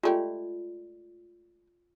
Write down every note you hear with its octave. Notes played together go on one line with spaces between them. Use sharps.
G#3 A3 F4 G4 D5